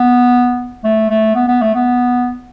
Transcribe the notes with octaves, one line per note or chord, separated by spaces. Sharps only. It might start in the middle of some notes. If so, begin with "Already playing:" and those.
Already playing: B3
A3
A3
B3
B3
A3
B3